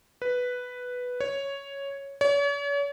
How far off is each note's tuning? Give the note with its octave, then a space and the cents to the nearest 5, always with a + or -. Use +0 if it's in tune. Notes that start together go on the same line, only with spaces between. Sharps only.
B4 +0
C#5 +0
C#5 +40